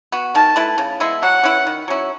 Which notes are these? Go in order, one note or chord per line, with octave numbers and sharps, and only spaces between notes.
B3 F#4
D#3 A5
A3 E4 B4
C#3
G#3 B3 E4
F#3 F#5
C#4 E4 B4
D#3
F#3 C#4 E4